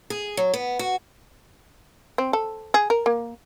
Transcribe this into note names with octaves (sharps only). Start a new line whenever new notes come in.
G#4
F#3
B3
F#4
C4
A4
G#4
A#4
A#3